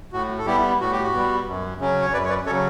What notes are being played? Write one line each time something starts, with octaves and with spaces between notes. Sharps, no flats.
A2 F#4
A4
G3 B3 E4 G4
A2 F#4
G4
F#4
G3 B3
F#2
C#3 F#3 C#4
C#5
F#2 B4 D5
C#5
B4 D5
C#3 F#3 C#4 A4 C#5